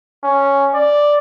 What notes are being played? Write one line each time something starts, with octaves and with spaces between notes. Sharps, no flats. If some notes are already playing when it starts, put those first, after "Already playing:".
C#4
D5